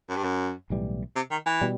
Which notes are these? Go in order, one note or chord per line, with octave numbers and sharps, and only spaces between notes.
F#2
G2
F#2
B1 A2 E3 G3
C3
D#3
E3
B2 G3